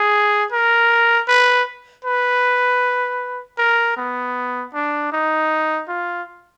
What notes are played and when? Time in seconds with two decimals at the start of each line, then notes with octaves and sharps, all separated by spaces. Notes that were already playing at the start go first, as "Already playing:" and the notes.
Already playing: G#4
0.52 A#4
1.28 B4
2.05 B4
3.58 A#4
3.97 B3
4.74 D4
5.13 D#4
5.88 F4